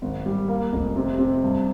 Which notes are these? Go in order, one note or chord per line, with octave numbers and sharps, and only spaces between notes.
G#1
G3
A#3
F1
C3
C3
G2